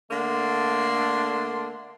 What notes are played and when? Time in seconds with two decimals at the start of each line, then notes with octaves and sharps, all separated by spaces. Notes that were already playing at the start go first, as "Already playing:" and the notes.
0.11 D3 A3 A#3 D4 C6